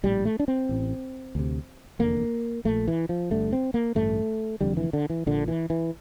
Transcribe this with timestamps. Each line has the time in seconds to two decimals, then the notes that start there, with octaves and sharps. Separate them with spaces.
0.03 A#1 A2 G3
0.25 A3
0.40 D4
0.48 C4
0.69 A1 A2
1.35 D2 C3
1.99 F1 E2 D3 A#3
2.65 A#1 A#2 A3
2.88 E3
3.09 F3
3.30 G1 G2 D3 A3
3.53 C4
3.74 A#3
3.95 A1 G2 D3 A3
4.61 F1 F2 D3 G3
4.77 E3
4.93 D3
5.10 E3
5.26 A#1 A#2 D3
5.48 E3
5.70 E3